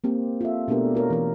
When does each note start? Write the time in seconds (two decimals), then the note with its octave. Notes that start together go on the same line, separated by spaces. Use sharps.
0.04 A#3 C4 G4
0.41 F4 A4 E5
0.68 B2 A3 B3 D4 G4 A#4
0.95 F4 A#4 C#5
1.10 E3 A#4